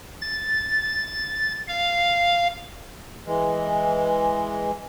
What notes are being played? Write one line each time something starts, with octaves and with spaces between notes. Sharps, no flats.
A6
F5
E3 G#3